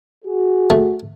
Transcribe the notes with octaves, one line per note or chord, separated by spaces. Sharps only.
F#4 G#4
A3